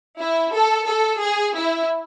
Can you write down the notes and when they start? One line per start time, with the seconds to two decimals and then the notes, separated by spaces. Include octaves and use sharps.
0.20 E4
0.54 A4
0.87 A4
1.21 G#4
1.55 E4